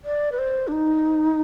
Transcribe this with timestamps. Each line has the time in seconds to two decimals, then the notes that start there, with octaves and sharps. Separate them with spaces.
0.05 D5
0.32 B4
0.39 C5
0.68 D4
0.72 D#4